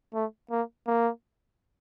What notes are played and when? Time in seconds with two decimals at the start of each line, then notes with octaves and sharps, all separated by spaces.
0.14 A3
0.51 A#3
0.87 A#3